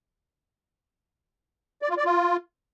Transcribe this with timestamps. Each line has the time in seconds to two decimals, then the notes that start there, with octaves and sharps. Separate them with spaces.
1.82 D5
1.90 F4
1.97 D5
2.05 F4